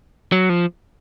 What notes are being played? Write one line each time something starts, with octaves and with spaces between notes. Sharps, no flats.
F#3
F3